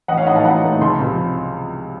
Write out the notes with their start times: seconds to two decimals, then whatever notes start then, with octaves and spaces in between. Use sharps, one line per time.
0.08 A1 D#5 F#5
0.17 C#5 F5
0.26 A2 A3 D#4 D#5 F#5
0.35 F5 A5
0.45 A1 F#5 A#5
0.63 A2 A3 D#4
0.81 C#2 A5 C6
0.99 C3 F3 C4